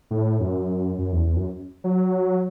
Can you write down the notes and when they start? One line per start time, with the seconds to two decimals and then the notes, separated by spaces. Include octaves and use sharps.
0.11 A2
0.40 F#2
0.98 F#2
1.12 E2
1.27 E2
1.36 F#2
1.84 F#3